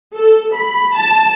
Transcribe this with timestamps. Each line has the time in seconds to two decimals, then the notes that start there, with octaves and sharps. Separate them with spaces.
0.15 A4
0.54 B5
0.96 A5